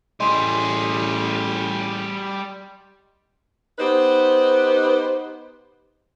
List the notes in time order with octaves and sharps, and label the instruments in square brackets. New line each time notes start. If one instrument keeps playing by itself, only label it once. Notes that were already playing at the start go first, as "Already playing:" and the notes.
[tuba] A1 [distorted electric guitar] G3 G#4 [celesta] D#5 C6
[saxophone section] B3 D#4 G4 B4 C5